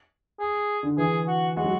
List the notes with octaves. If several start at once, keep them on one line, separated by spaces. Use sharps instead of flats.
G#4
D3
E3 G#4
F#4
G#3 F#4
F#3